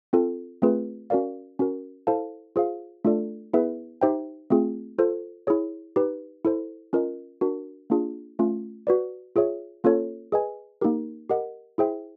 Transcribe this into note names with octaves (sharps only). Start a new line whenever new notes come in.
C4 F4 A4
A3 C4 F4 G#4 B4
C#4 F#4 A#4 D5 F5
C#4 F#4 A#4
E4 A4 C5 F5 A5
F4 G#4 C5 F5
A3 D4 F4 A4 D5
B3 E4 G#4 B4 E5
D#4 G4 C5 E5 G5
A3 C4 F4 G#4
F4 A4 C5
E4 G#4 C#5
D#4 G4 B4
E4 A4 C5
C#4 F4 A#4 D#5
D4 F#4 A#4
A#3 D4 F4 G#4
A3 C#4 F4
F#4 B4 D5
F4 G#4 C#5 E5
A#3 C#4 F4 A4 C#5
G#4 B4 D#5 G#5
A#3 D#4 G4 A#4
G4 A#4 D#5 F#5
E4 G#4 C5 E5 G5